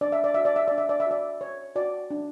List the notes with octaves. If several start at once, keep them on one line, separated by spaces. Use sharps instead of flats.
D4 D5
E5
D5
F#4 E5
D5
E5
D4 D5
E5
D5
E5
F#4 D5
C#5
F#4 D5
D4